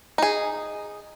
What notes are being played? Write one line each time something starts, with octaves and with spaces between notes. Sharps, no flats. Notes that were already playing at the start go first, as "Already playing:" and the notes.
D#4 G#4